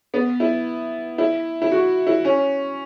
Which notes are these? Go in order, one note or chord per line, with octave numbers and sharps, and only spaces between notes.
B3
E4
E4
E4
F#4
E4
C#4